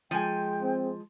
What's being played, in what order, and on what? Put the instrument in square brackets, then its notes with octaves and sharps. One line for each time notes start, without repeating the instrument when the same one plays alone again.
[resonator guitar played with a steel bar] F3 G#5 [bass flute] G#3 [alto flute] G5
[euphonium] C4